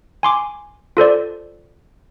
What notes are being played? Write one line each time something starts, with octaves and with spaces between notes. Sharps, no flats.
G#5 C6 D6
F4 A4 C5 D5